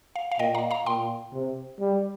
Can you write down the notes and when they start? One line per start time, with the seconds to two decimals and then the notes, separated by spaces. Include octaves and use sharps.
0.16 F5
0.32 F5
0.39 A#2 D#5 G5
0.55 F5 A#5
0.71 F5 A#5
0.86 A#2 G5 C6
1.33 C3
1.80 G3